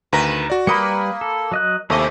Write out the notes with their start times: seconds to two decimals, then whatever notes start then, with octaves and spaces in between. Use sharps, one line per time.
0.13 D2 D#3 B4 A#5 A#6
0.50 F#4 D5
0.67 G3 A#3 B4 D5 B5 D#6 C#7
1.21 A4
1.52 F#3 D#5 F#6
1.90 D#2 C3 A3 E4 D#5 G#5 D6